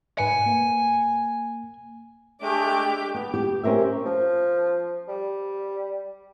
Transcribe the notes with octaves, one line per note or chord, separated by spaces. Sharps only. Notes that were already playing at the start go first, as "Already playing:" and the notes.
G#2 B4 G#5 C#7
A#3
G#3 A3 D4 G4 D6
B3
G4
C#4 G4 A#4 C5 E5
F3
G3